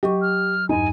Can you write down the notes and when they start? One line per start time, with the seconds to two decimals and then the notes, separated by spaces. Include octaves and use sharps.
0.03 F#3 G4 D#5 C#6
0.22 F6
0.69 E2 G2 D#4 G#5